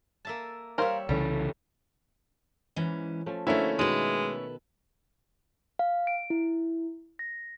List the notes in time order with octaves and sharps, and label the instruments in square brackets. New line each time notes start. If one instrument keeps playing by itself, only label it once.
[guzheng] A#3 E5 A5
[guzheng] G3 C#5 E5 [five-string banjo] A#4 C5 F5
[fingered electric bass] C2 C#3 E3 [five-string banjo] G3 [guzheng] A3
[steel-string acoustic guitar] G#2 E3 C#4
[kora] F3 A3 C#4
[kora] D3 A#3 [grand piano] A3 C#4 E4 [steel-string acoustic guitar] F#4 C5
[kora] B2 D#3 D#5 [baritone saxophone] G#3 [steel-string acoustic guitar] A4 B4
[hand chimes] F5
D7
E4
A#6